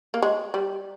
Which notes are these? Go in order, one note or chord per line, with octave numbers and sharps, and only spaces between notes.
A#3
G#3
G3